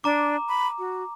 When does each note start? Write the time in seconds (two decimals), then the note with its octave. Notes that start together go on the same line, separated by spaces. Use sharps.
0.04 D4 A#5 D6
0.49 B5
0.79 F#4